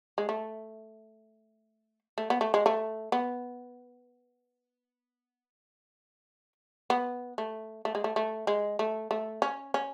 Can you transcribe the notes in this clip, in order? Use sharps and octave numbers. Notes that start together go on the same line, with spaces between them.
G#3
A3
A3
B3
A3
G#3
A3
B3
B3
A3
A3
G#3
A3
A3
G#3
A3
A3
C#4
C#4